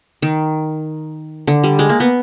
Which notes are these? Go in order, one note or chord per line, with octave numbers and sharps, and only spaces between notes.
D#3
D3
G3
G#3
A#3
B3